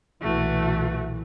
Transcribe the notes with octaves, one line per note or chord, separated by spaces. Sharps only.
B1 A#2 E3 A3 F#4